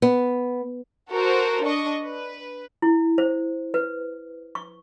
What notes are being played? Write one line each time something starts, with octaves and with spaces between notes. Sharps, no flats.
B3
F#4 A4 A#4 C5
D4 D#5 C#6
B4
E4
C5
B4
C#6